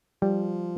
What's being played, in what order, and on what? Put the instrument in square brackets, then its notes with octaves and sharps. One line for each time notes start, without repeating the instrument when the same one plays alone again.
[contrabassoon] F3 [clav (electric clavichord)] G3